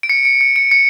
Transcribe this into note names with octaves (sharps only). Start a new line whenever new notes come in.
D7
C#7
D7
C#7
D7
C#7